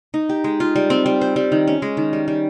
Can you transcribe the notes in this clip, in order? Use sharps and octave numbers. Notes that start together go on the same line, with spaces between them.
D#4
G4
G#3
F4
G3
C4
G3
C5
G3
D#3
C#4
G#3
D#3
G3
G3